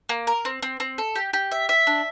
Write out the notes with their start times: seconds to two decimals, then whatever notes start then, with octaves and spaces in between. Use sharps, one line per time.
0.09 A#3
0.27 A#4
0.45 C4
0.62 C4
0.80 C4
0.98 A4
1.15 G4
1.33 G4
1.51 E5
1.69 E5
1.87 D4